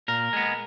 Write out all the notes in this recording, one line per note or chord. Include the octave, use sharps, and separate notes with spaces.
A#2 A#4
G#3 B3